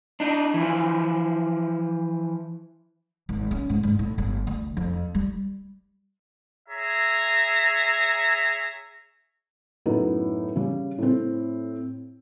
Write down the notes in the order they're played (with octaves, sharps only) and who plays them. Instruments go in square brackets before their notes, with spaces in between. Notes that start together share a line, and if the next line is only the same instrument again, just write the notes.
[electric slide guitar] D4 D#4
E3 F3
[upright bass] G#1
C#4
G#2
G#2
A2
G1
D2
F2
G3
[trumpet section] G#4 C#5 E5 A#5
[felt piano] F#2 A2 B3 D#4
C#3 G3
A2 C4